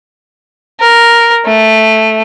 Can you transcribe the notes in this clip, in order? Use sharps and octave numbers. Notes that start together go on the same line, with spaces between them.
A#4
A3